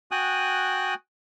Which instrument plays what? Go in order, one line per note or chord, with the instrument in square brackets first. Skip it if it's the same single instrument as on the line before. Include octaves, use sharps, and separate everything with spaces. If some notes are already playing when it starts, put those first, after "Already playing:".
[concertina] F#4 G5 G#5 D#6 F#6